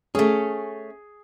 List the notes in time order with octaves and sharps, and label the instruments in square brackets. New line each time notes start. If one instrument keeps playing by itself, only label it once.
[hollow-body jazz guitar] A3 C#4 [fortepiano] G#4